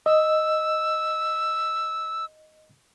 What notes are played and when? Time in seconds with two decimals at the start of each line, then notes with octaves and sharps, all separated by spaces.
0.06 D#5 E6